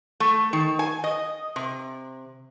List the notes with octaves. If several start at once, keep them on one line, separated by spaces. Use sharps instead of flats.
A3
D#3
G#5
D#5
C3